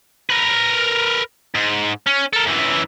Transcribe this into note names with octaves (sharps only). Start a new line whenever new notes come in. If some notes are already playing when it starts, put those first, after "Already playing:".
A#4 B4
G#2
C#4
A4 A#4
F#2 E3